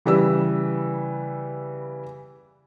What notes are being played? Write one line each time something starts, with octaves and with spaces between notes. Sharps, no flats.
C#3 E3 G3 B4 E6